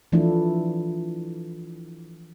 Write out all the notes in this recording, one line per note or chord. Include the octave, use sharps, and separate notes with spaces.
E3 F3 A3 D4 E4